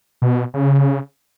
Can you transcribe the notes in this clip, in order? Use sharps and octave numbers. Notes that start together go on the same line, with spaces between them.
B2
C#3